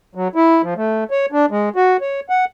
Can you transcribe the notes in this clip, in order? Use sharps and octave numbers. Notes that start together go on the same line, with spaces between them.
F#3
E4
F3
A3
C#5
D4
G#3
F#4
C#5
F#5